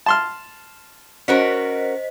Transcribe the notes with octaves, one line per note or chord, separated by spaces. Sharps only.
A5 C6 F6
C#4 F#4 A#4 C5 D#5 B6